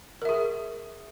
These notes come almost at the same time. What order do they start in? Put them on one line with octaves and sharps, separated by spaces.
A#4 E5 G#4